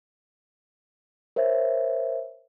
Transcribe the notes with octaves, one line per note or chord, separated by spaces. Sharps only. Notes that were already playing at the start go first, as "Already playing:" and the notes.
A#4 C5 C#5 E5